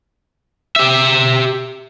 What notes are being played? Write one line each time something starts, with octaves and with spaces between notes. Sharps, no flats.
G4 E5